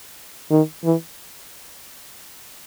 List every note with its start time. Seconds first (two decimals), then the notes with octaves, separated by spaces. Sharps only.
0.51 D#3
0.84 E3